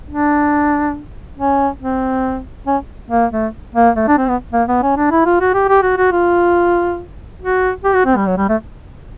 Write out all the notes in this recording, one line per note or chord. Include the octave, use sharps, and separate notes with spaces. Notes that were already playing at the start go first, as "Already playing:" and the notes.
D4
C#4
C4
C#4
A#3
A3
A#3
A3
D4
C4
B3
A#3
B3
C#4
D4
E4
F4
F#4
G4
G4
F#4
F#4
F4
F#4
G4
F#4
C4
G3
F#3
G3
A3